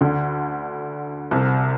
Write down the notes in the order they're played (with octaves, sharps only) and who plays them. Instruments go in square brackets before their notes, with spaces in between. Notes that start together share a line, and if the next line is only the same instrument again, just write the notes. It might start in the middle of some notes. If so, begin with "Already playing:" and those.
[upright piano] D2 D3
C2 C3